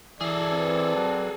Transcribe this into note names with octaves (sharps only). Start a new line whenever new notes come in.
E3 G#4 A4 D5
C4 B4
F#3